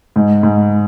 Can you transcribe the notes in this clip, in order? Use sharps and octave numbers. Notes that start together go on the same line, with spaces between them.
G#2
G#2